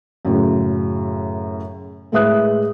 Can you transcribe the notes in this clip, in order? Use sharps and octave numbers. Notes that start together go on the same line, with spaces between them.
F#2 A2 C#3
A2 G#3 B4 E5 D#6 F#6